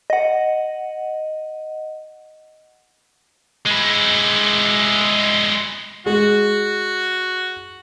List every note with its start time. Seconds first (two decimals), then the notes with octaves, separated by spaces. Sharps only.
0.10 D#5 F#5
3.66 G#3 E4
6.06 G#3 F#4 G#4